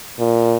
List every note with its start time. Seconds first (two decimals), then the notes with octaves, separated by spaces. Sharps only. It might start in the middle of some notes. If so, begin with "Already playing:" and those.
0.19 A#2